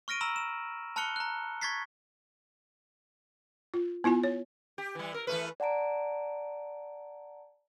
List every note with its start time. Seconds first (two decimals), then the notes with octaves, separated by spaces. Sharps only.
0.08 C#6 F6 A#6 D7 D#7
0.21 A#5 B5 E6 E7 F#7
0.36 E7
0.96 A5 B5 F6 F#6 C#7 G7
1.16 A#5 F#6
1.61 C#6 G#6 A6 B6 C7
3.74 F4
4.04 B3 E4 F4 G#5
4.24 C#5
4.78 G4
4.95 E3 G3
5.14 A#4
5.27 E3 A3 B4
5.60 D5 F#5 A5 A#5 D7